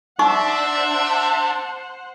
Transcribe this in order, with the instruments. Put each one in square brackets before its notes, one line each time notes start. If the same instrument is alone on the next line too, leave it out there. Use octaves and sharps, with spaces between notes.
[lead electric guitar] D4 [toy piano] D#4 C#6 [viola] C5 F#5 [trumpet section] E5